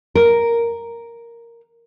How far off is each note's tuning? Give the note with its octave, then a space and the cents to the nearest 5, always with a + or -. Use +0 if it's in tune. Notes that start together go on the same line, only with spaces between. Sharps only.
A#4 +0